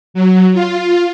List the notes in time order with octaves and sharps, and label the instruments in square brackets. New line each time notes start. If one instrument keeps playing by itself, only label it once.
[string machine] F#3
F4